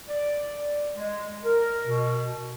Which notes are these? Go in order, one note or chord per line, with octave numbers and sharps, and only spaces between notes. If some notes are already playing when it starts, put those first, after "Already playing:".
D5
G#3
A#4
B2